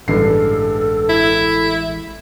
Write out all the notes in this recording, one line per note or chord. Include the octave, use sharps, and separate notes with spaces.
A1 G2 D3 E3 G#3 A4 C7
E4